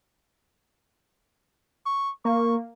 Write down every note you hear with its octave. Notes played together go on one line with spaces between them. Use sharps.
C#6
A#3 C#6